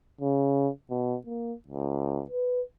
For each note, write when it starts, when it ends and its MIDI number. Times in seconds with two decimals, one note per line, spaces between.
0.21 0.69 49
0.90 1.17 47
1.26 1.53 58
1.68 2.23 37
2.29 2.61 71